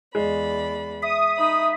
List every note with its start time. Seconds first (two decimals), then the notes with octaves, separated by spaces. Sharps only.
0.15 E2 G#3 D5 B5
1.03 E5 D#6
1.37 D#4 B5